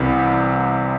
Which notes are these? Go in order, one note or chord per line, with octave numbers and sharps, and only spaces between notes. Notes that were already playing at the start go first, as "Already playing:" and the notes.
Already playing: C2 C3 E3